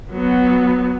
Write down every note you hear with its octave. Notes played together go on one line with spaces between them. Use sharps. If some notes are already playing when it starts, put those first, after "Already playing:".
F#3 B3